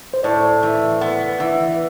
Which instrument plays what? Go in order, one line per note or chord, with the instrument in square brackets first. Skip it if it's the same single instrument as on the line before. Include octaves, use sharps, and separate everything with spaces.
[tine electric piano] C5
[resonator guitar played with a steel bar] A2 [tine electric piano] D5
[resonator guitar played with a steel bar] E3
B3
E3